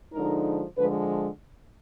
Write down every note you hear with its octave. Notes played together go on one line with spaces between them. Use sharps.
D3 F3 G#3 D#4 A#4
D3 F3 G#3 B4